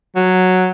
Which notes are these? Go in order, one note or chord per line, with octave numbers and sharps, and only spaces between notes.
F#3